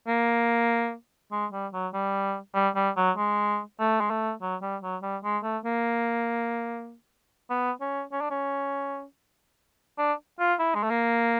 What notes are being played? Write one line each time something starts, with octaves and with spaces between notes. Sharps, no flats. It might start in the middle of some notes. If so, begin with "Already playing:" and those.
A#3
G#3
G3
F#3
G3
G3
G3
F#3
G#3
A3
G#3
A3
F#3
G3
F#3
G3
G#3
A3
A#3
B3
C#4
C#4
D4
C#4
D4
F4
E4
G#3
A3
A#3